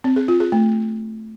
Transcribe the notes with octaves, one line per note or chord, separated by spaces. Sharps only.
C4
G#4
F4
G#4
A3